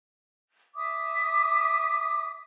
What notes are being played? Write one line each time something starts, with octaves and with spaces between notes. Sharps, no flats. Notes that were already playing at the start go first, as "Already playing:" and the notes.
E5 D6 D#6